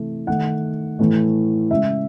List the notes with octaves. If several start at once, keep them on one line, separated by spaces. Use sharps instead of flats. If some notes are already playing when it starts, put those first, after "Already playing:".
Already playing: C3 E3 A3
D#3 A3 F#5
A2 E3 A3
C#3 G#3 E5